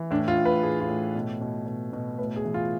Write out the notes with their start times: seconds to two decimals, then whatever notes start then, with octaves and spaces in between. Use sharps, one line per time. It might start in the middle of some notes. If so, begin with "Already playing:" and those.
Already playing: E3
0.11 A2 D4
0.28 F4
0.38 A2
0.45 B4
0.63 A2 G#4
0.80 F4
0.89 A2
1.15 B2
1.41 B2
1.66 B2
1.93 B2
2.19 A2 B4
2.36 G#4
2.45 E3
2.54 F4